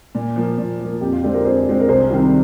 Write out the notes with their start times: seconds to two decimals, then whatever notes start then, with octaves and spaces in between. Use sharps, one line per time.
0.15 A#2
0.36 F3 A#3
0.58 A#2
0.80 F3 A#3
1.01 F2 G4
1.12 F4
1.23 D3 G#3 C4 G4
1.34 G4 A#4
1.45 F2 G#4 C5
1.67 D3 G#3 C4
1.80 A#4
1.88 C2 G#4 C5
2.10 C3 D#3 G3